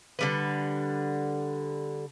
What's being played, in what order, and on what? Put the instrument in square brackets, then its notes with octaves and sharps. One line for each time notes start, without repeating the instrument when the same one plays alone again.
[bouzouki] D3 G3 B4